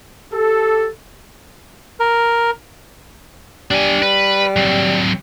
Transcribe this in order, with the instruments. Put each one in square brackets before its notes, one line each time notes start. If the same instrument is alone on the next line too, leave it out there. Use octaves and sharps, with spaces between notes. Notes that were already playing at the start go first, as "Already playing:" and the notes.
[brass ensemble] G4 A4
[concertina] A#4
[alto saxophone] G3 [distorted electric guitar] D4 G#5
[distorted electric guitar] B4
F#3 C4